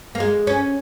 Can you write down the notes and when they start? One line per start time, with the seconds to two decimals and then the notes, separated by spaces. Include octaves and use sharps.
0.15 A#3
0.20 G#3
0.47 C#4